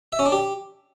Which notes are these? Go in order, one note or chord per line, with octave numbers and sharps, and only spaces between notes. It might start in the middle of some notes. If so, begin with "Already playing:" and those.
E5
C#4
D4
G4